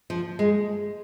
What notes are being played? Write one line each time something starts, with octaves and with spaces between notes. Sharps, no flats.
F3
G#3